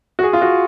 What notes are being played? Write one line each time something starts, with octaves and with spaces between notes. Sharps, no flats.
F#4
G#4
F4
F#4